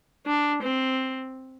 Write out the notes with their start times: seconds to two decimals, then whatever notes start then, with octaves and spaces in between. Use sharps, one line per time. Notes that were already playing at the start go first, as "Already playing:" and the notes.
0.26 D4
0.63 C4